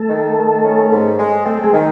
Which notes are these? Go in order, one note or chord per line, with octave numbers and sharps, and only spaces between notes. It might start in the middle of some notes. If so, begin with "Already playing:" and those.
Already playing: A3 A4
D#3
D#3
C#4
G#2
G#3
A3 C4 A4
A4
G#3 G#4
D#3